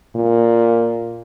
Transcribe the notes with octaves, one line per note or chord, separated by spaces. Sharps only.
A#2